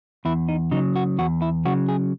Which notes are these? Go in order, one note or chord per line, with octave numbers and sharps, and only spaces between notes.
E2 E4
D#4
C#3 F#3 D#4
F#4
E2 F#4
E4
C#3 F#3 F#4
G#4